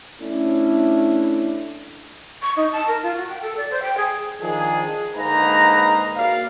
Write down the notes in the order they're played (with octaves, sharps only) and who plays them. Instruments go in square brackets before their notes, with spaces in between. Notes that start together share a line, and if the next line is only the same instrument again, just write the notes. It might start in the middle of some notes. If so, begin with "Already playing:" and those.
[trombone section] A3 C#4 D4 E4
[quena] C#6
D#4
A5
A#4
F4
F#4
G5
A4
D5
C5
G5
G#4
[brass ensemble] D#3 F3 D4 G#4
G#2 D3 A#3 D#4 B4 A#5
A#3 F#4 D5 F5